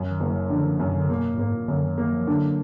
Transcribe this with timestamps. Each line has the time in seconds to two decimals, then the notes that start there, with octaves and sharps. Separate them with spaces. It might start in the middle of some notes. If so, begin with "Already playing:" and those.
Already playing: F#2
0.11 D#3
0.20 F#1
0.31 F#3
0.50 D3 F3
0.64 F3
0.80 F#2 D#3
0.88 B2
0.95 D3
1.09 B2 A#3
1.34 A#2
1.38 G#2 A#3
1.54 A#2
1.68 F#2 D3
1.83 D#3
1.98 D#3 A#3
2.13 F3
2.27 D3 F#3